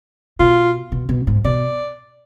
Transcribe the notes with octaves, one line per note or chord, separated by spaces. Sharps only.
B2 F4
B2
B2
G#2
B2 D5